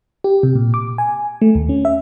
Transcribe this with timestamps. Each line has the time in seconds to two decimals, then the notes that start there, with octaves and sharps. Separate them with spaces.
0.24 G4
0.43 C3
0.55 A#2
0.74 D6
0.98 G#5
1.42 A3
1.55 D#2
1.69 C#4
1.85 E5